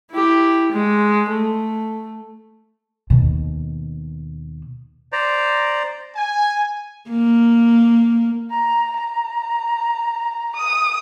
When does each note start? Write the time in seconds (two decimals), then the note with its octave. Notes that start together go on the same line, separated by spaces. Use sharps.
0.11 E4 G4
0.72 G#3
1.29 A3
3.10 D#2 B2
5.12 C5 D5 A#5
6.16 G#5
7.10 A#3
8.50 A#5
8.96 A#5
10.56 D#6